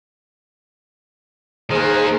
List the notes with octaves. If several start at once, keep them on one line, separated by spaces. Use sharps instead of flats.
D#3 A#3 G#4 C5